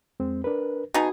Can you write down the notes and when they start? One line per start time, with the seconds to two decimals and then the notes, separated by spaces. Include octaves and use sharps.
0.20 F2 G#3 C4
0.44 D4 A#4 B4
0.94 B2 D#4 F#4 G#4